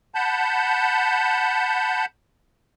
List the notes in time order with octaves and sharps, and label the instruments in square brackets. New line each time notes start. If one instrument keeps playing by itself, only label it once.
[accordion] F#5 A5 B5 G6